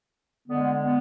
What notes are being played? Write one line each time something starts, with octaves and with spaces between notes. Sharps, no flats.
D3 G#3 B3
B3